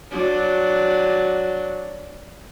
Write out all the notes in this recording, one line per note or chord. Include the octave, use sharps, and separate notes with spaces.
F#3 D4